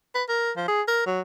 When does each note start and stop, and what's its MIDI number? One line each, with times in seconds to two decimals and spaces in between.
0.15 0.24 71
0.29 0.51 70
0.57 0.66 53
0.68 0.82 68
0.88 1.03 70
1.06 1.21 54